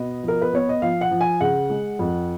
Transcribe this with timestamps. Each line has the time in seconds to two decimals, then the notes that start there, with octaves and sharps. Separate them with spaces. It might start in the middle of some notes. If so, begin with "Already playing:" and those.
Already playing: B2 B3 D#5
0.23 F3 A#4
0.42 B4
0.53 B3 C#5
0.69 D#5
0.82 F3 F5
1.01 F#5
1.11 F3
1.21 G#5
1.41 C#3 F#5
1.70 G#3
1.99 F2